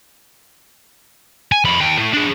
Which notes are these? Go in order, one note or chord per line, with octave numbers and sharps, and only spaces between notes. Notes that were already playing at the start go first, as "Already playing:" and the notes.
G#5
F2 B5
D#2 G5
A2 A3
D4 G#4